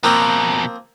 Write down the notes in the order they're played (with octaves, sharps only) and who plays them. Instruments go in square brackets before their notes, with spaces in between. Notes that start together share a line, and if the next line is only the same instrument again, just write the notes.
[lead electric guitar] F2 B2 [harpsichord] F3 A#3 C4 [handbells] A#5 F#6